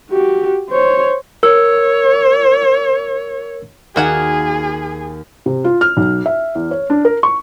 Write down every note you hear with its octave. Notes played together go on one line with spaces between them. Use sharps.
F#4 G4
C5 C#5
A#4 C#5 E6
D#2 A#3 F#4 G#4 F#5 F6 G#6
C3
F4
F6
B1
E5
E2
C#5
D4
A#4
C#6